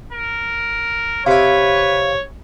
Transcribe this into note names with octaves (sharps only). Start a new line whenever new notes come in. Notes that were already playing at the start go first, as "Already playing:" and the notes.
A#4
C3 E4 B4 C#5 F5